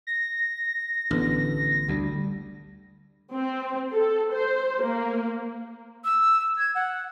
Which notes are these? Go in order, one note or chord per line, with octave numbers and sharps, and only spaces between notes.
A#6
A1 D3 B3
D2 D3 G3
C4
A4
C5
A#3
E6
G#6
F#5